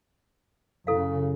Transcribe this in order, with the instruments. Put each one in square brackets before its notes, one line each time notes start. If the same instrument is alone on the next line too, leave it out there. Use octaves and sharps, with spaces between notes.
[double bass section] F#2 C#3 [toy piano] E4 A4 F5